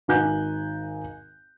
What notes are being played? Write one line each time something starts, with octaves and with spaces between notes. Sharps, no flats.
G#1 D#4 G#5 F#6 G6